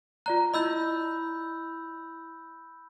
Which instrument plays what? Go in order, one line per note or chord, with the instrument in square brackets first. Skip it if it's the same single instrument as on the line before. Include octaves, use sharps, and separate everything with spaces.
[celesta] F4 D5 A#5 [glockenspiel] F#6
[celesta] E4 D#5 [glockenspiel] B5 E6 G6